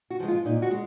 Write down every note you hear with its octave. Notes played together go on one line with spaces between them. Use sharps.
F#4
F3 G#3
F4
A#2 D#4
F#4
G#3